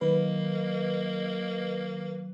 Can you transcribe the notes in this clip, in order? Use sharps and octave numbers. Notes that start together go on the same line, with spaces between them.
D#3 F#3 A#3 B4 D#5